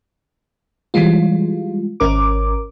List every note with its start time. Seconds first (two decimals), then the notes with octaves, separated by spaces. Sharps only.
0.94 E3 G3 G#3 F4
2.00 G#1 C#4 A#4 D6